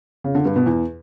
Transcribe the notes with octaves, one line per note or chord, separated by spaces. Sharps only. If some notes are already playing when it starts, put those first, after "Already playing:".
C#3
D3
G2
B2
E2